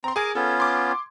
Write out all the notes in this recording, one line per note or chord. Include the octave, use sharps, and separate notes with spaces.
C4 A#5 C6
G#4 A#4 G#5 D6 G#6
B3 C#4 F4 A4
C6 D6